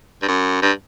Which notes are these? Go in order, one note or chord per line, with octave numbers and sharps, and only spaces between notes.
G2
F#2
G2